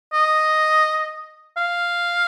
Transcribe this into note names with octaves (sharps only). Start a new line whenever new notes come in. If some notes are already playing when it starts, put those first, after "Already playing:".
D#5
F5